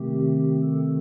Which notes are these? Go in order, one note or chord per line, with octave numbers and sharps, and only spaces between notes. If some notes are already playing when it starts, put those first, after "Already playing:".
Already playing: C3 D#3 A3 C4 G4
A4